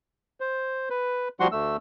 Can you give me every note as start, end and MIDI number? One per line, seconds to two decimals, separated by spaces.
0.40 0.89 72
0.90 1.29 71
1.40 1.48 53
1.40 1.48 55
1.40 1.48 66
1.40 1.48 78
1.40 1.48 84
1.52 1.77 38
1.52 1.77 57
1.52 1.77 88